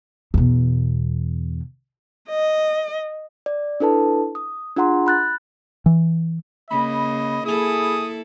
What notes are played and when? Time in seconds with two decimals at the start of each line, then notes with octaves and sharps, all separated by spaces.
0.34 E2 B2
2.30 D#5
3.46 D5
3.80 D4 E4 A4 B4 A5
4.35 D#6
4.77 D4 F4 G#4 F#5 A#5 C6
5.06 B5 F#6 A6
5.86 E3
6.70 C#3 A#3 D#5 B5
7.46 A#3 E4 G#4 A4 D#6